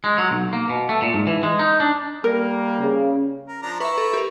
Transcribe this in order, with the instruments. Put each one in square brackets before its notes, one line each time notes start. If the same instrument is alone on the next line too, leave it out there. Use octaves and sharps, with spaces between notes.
[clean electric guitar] G#3
F#3
B1
A#3
B2
A3
A#2
G#2
E3
G#3
D#4
D4
[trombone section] G3 A#3 [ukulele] A#4
[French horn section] C#3
[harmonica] A#4
F3 D4 A#5
[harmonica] E4 A#5 C#6 [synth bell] B4 E5
[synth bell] A4
G4 A#4